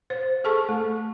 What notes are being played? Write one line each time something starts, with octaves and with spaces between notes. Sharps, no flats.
C5
G#4 A4 A5 C#6
A3